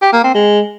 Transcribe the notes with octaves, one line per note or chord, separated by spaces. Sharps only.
G4
A#3
C4
G#3